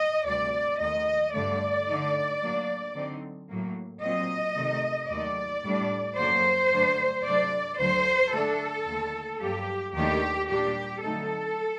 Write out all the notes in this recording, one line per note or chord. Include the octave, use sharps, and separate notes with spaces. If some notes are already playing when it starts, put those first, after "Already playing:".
Already playing: D#5
D2 C3 G3 D5
D#2 D#3 A3 D#5
G2 D3 A3 D5
D3 A3 D#4
A2 F#3 A#3 D4
D3 F#3 C4 D#4
A2 F#3 A#3
A#2 F#3 C4 D#5
C3 D#3 A3 D#4
D#2 D#3 F#3 A3 D5
A2 G3 D4
F#2 D3 F#3 A#3 C5
G2 D3 F#3 A3 D4
C3 F#3 A3 D4 D5
D2 D3 F#3 C5
D3 A3 D4 A4
D#2 D3 A3
G2 F#3 A#3 G4
D#2 D#3 F#3 A3 D4 G4
A#2 G3 D4 G4
D3 F#3 A3 C4 D#4 A4